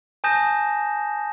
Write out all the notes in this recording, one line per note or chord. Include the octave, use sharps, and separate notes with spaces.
G#5 A5 D#6 G6 A#6 E7